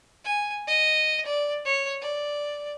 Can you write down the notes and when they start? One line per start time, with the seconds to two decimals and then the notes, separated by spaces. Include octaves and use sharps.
0.25 G#5
0.68 D#5
1.26 D5
1.65 C#5
2.01 D5